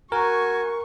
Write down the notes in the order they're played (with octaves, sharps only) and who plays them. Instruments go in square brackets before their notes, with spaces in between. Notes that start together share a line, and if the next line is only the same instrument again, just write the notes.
[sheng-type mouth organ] F#4 G#5 [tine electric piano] A#4 [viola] C#6